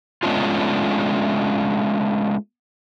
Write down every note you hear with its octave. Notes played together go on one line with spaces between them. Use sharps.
G#3 A3 B3 C#4 D4 F4